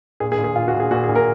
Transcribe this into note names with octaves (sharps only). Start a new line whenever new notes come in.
A#2 G#4
G#4
A#2
G#4
A#2 F4
F#4
A#2
G#4
A#2 F#4
G#4
A#2
A#4